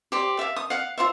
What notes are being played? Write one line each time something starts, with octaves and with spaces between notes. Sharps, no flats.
G4 C5 D5
E5 F5
D#6
F5 F#5
F4 C5 E5